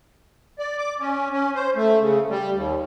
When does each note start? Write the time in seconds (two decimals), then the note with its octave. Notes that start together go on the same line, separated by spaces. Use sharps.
0.59 D5
0.78 D6
1.01 C#4
1.32 C#4
1.55 C5
1.76 A3
2.01 C#3
2.30 G3
2.54 D#2